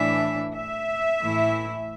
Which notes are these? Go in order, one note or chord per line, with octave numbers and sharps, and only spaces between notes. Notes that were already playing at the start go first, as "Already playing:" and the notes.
Already playing: A2 E3 A3 D4 E5
E5
A2 E3 A3 E4